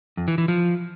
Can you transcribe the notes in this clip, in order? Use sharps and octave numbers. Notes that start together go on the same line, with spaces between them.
F2
E3
E3
F3